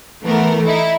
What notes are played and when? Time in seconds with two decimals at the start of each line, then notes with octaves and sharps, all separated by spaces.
0.23 E3 A3 B3 A#4
0.66 D#4 E4